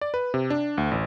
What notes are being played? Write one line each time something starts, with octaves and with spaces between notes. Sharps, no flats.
D5
B4
C3
D4
D2
A1